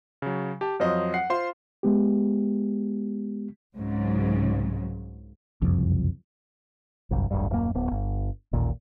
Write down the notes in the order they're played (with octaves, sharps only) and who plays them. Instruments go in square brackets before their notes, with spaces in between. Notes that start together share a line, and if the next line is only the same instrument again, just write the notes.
[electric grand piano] C#3 F#3
[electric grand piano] G4 [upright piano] A5
[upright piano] F2 C5 D#5 [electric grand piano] F#3 C#5
[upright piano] F#5 [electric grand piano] C7
[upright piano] F4 [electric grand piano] C5 C6
[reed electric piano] G#3 B3 G4
[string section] C2 G#2 C#3 F#3
[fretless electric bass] F#1 C2 F2
[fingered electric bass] G1 C2 F#2
D1 A1 G2
D#1 F#2 A2 A#3
D1 B3
G1
A1 D#2 A#2